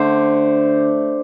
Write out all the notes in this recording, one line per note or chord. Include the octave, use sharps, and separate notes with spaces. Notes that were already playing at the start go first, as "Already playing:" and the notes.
Already playing: D3 A3 C5